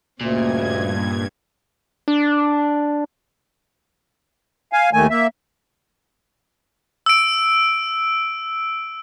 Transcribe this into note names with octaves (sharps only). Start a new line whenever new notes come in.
D2 G2 A#2 C#3 A#3 D#5 G#6
D4
F5 G#5
D#2 D#3 A3 G#5
A#3 E5
E6 D7